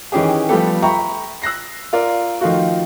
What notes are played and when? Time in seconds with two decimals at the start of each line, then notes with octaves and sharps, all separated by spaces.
0.12 D#3 E3 C#4 G4 G#4
0.49 F3 G3 A3 B3 G4 A4
0.83 E5 G5 A#5 B5 C#6
1.42 E6 F#6 A#6 C7
1.93 F4 A#4 D5
2.41 D#3 F3 A3 F4 F#4